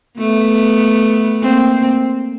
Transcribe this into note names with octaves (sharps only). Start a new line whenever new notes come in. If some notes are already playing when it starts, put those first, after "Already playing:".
A3 B3
A#3 C4